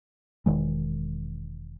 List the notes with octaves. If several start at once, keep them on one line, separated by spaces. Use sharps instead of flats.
E1 D#3 G#3